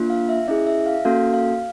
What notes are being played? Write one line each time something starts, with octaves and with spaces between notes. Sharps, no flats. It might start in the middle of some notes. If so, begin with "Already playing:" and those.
Already playing: A#3 D4 F4
F5
E5
C#4 E4 G#4 D#5
E5
F5
A#3 C#4 F#4 A4 F5
F5